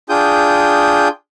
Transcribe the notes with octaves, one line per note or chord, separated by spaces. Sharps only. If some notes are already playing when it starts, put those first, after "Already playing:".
D4 F4 G#4 G5 D#6 G6